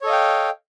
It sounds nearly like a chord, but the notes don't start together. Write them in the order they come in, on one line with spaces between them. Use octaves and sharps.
C#5 A4 D#5 F5 G5